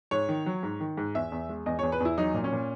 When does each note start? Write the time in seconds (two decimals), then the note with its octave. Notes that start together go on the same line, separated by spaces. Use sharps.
0.11 G#2 C#5
0.29 D#3
0.46 F#3
0.63 G#2
0.80 D#3
0.97 G#2
1.15 E2 E5
1.32 E2
1.49 G#3
1.66 E2 D#5
1.79 C#5
1.83 E2
1.92 B4
2.00 E2 E4
2.18 F#3 D#4
2.34 A#2
2.44 C#4
2.53 A#2